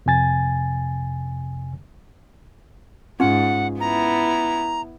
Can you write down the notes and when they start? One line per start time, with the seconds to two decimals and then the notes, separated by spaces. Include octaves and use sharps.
0.06 F2 C3 G#5 A6
3.20 G#2 C#4 F4 F#5
3.80 B3 E4 A#5